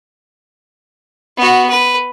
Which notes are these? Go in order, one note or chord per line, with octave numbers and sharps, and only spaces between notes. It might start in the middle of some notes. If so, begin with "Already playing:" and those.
B3 F#4
B4